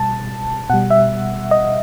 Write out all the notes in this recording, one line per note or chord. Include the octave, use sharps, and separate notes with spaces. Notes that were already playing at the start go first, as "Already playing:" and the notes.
Already playing: B2 G3 A5
B2 G3 F#5
E5
D#5